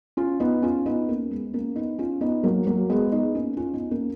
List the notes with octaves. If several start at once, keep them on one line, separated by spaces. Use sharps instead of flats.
C#4 F4
B3 D#4
C#4 F4
B3 D#4
A#3 C#4
G#3 B3
A#3 C#4
B3 D#4
C#4 F4
B3 D#4
F#3 A#3
F#3 A#3
G#3 B3
B3 D#4
A#3 C#4
C#4 F4
B3 D#4
A#3 C#4